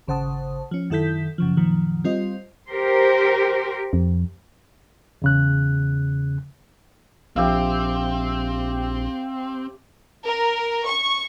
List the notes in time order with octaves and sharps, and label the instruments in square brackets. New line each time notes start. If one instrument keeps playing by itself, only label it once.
[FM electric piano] G#1 C#3 C5 F#5 A5 D#6
F3 C#4
F#2 D#3 E4 A4 G6 B6
F#2 C#3 F3
F#2 A#2 D#3 F3
G3 C4 F4 C5 D#5
[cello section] G4 A#4 C5
[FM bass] F2
[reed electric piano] E2 C#3 F#6
[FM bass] A#1 [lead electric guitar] C4 [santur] G4 E5 F5
[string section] A#4
C#6